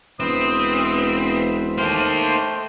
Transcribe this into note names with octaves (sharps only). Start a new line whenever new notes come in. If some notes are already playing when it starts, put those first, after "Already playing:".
E1 C4 B4 C5 E5 D#6
A3 A#3 D#4 C5 G5 C6